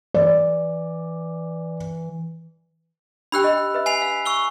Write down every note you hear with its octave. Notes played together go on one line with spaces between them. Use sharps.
E3 D5
D4 G4 G5 B5 E6 F#6
D#5
B4 E5
G#5 C7 F7
F5
C#6 E6 G7